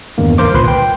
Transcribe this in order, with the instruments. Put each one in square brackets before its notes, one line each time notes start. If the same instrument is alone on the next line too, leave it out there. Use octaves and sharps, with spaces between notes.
[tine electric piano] E2 G2 D#3 A#3
G#1 C#2 A#4 C5 C6 D6
G1 C2 A#2 B4 C6
G5